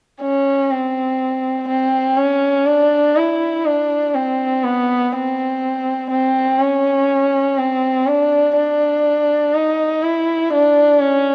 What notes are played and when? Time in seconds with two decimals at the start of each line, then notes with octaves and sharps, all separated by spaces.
0.22 C#4
0.70 C4
1.68 C4
2.17 C#4
2.67 D4
3.16 E4
3.65 D4
4.15 C4
4.64 B3
5.13 C4
6.10 C4
6.60 C#4
7.58 C4
8.07 D4
8.56 D4
9.55 D#4
10.03 E4
10.53 D4
11.02 C#4